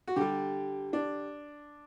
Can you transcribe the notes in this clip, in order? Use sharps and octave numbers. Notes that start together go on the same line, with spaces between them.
F#4
D3 G3 G4
D4